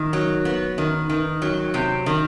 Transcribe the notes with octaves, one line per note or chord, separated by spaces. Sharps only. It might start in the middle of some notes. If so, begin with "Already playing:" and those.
Already playing: D#3
F#3
B3
D#3
D#3
F#3
C3
D#3